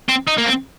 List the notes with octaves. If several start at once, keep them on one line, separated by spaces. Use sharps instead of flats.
C4
D#4
A#3
C4